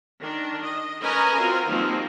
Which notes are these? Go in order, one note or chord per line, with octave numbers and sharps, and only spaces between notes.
D#3 D4
D#5
C#4 A#4 B4 D#5 G#5 A#5
C4 F4 F#4 A#4
D#3 F3 G3 A#3 C4